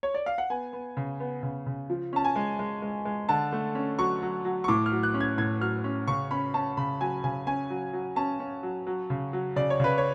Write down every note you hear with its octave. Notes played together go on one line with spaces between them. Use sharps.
C#5
D5
F5
F#5
B3 G#5
B3
C#3
B3
C#3
C#3
F3
C#4 A5
G#5
G#3
G#3
G#3
G#3
D3 A5
A3
C#4
F#3 C#6
F#3
F#3
C#6
A2 D6
F6
F#3
F#6
C#4
G#6
A2 G#6
F#3 F6
C#4
C#3 C#6
C#4 B5
C#4 A5
C#3 B5
F#3 G#5
C#3 G#5
C#4 G#5
F#3
F#3
C#4 A5
C#4
F#3
F#3
C#3
F#3
C#3 D5
C#5
C#3 B4
C#5